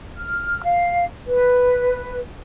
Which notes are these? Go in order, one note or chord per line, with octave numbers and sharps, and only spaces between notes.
F6
F5
B4